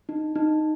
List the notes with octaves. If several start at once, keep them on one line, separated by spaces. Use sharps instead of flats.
D#4
D#4